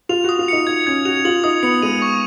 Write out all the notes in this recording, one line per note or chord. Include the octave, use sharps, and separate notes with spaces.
F4 F7
F#4 D#6
F4
D#4 C#7
D#4 G#6
C#4 G#6
F#4 F7
F4 F#7
D#4 D#6
B3 C#7
G#3 D#7
C#6